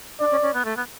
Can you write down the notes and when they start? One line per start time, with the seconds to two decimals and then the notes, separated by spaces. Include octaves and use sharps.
0.20 D4 D5
0.31 C#4
0.42 C#4
0.54 B3
0.65 A3
0.77 B3